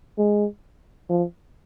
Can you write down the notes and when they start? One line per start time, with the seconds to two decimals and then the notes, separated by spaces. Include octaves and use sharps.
0.18 G#3
1.10 F3